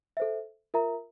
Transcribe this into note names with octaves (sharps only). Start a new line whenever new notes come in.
A4 C5 E5
F4 A#4 E5 A#5